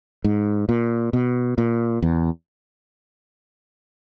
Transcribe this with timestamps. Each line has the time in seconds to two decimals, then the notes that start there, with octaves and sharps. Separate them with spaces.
0.24 G#2
0.69 A#2
1.13 B2
1.58 A#2
2.02 E2